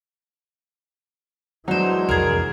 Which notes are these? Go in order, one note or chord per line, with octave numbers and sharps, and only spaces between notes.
E3 F#3 G#3 D4 D#4 C5
C2 F2 G#4 A#4